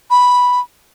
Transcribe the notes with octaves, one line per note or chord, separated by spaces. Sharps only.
B5